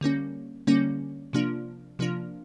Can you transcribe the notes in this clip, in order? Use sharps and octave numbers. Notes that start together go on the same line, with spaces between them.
D3 G3 A#3 C#4
D3 G3 A#3 C#4
C3 F3 A#3 D4 F4
C3 F3 A#3 D4 F4